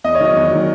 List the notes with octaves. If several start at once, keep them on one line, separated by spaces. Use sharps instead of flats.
E2 D#5
C#5
D#3 F#3 D#5
E2
D#3 F#3